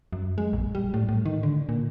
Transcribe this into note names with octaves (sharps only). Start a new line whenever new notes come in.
F#2
G#3
A#1
G3
A2
A2
D#3
D3
A#2